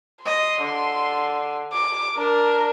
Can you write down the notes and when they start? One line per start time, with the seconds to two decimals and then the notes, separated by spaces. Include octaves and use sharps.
0.25 D#5 C6
0.60 D3
1.73 D6
2.17 D4 A#4